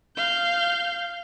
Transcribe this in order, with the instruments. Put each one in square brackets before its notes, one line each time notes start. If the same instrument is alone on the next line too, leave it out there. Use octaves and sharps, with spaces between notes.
[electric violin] F5 G6